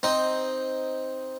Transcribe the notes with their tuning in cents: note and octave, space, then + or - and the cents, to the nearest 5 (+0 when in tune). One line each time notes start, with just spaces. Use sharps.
C4 +0 D#4 +5